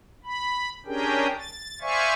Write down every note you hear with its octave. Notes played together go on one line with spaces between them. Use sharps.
B5
C#4 D4 G4 G#4 A#4 G5
A6
C5 D5 E5 F5 G#5 C#6